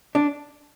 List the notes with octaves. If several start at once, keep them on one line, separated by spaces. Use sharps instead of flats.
D4